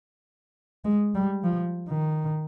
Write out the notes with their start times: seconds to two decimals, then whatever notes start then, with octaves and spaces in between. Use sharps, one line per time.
0.85 G#3
1.15 G3
1.44 F3
1.88 D#3